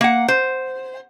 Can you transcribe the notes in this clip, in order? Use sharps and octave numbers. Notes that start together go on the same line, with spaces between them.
A#3 F#5
C5